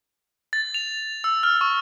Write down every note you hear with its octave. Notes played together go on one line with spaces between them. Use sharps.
A6
F7
E6
F6
C#6